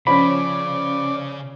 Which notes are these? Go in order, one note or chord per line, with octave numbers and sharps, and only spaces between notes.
C#3 F3 C#4 D5 B5